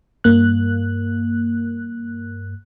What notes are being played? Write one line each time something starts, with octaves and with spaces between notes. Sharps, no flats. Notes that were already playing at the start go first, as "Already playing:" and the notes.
G2 A#3 F#6